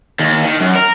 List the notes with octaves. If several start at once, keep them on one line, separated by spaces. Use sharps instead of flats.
D#2
D#3
F#2
A#4